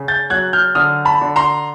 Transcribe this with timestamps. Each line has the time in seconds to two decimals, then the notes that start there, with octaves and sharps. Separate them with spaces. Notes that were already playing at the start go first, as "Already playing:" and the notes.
Already playing: C#3
0.08 G6 A6
0.30 F#3 F#6 G#6
0.53 F6 G6
0.75 D3 D#6 F6
1.05 A5 B5
1.21 D3
1.36 A#5 C6